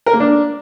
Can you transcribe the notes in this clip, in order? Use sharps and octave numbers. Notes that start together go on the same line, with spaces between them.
A#4
A#3
D4